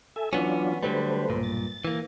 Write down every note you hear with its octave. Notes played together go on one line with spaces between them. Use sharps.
A4 E5 G#5
E3 F#3 B3 C#4 D4 F4
D3 F#3 G3 A3 B4 C5
B1 G2 A#2
A6
E3 A#3